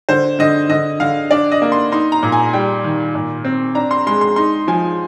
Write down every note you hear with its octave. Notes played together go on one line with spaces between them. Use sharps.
D3 C5
D3 D#5
D3 D#5
D3 F5
D4 D5
D#5
A#3
C6
D#4 C6
A#5
A#2
G#5
G3 G5
D#3
A#2
C4
D4 A#5
C6
G#3 C6
C6
D#4 C6
F3 G#5